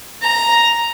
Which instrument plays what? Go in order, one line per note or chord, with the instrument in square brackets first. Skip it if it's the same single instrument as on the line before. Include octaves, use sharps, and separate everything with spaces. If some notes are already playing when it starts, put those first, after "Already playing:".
[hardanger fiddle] A#5